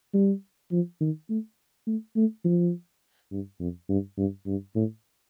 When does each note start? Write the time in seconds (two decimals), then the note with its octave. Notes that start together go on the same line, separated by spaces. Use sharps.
0.14 G3
0.72 F3
1.01 D#3
1.30 A3
1.87 A3
2.16 A3
2.44 F3
3.31 G2
3.60 F2
3.89 G2
4.18 G2
4.47 G2
4.75 A2